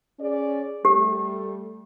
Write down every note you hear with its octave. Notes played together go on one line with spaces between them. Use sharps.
C#4 G#4 D5
G3 A3 G4